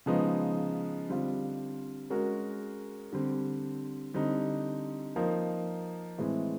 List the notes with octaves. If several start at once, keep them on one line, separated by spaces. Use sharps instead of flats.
C#3 F3 G#3 B3 D#4
D3 G3 C4 F4
G#3 C#4 F#4 A#4
D3 G3 C4
D3 G3 C4 D#4
F3 A#3 D#4
A2 E3 G#3 C4